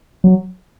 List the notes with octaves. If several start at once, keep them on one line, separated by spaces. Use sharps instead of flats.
F#3